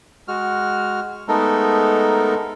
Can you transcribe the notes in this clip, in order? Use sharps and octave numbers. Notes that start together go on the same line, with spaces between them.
G#3 F#4 F6
G#3 A3 B3 D#4 A4 A#4